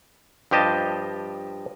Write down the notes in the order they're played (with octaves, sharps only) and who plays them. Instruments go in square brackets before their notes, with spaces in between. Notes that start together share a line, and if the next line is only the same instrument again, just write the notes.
[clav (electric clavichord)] G2 F3 G4 D#5 A5